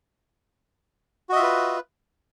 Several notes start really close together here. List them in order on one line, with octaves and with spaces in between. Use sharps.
F#4 D#5 E5 F4 B4